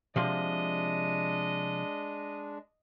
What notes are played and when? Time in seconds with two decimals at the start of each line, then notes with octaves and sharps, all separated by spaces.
0.16 C3 F3 G#3 D4 D#5 C6